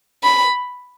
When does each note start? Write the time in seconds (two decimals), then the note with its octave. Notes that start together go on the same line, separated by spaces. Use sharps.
0.23 B5